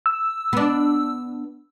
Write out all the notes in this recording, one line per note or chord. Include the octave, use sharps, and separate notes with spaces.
E6
B3 D4